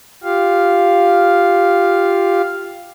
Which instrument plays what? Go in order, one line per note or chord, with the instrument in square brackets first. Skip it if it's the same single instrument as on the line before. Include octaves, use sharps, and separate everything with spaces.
[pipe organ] F4 G4 F5